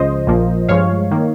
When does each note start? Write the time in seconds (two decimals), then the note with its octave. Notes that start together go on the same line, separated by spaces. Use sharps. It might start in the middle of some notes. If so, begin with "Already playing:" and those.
Already playing: C#2 C#3 F3 C5 D#5
0.27 A#1 A#2 F3 A#3
0.69 G2 F3 G#3 C#5 F5
1.11 D#3 A#3